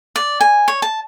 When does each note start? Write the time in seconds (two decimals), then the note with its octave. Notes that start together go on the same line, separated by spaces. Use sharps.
0.16 D5
0.41 G#5
0.68 C#5
0.82 A5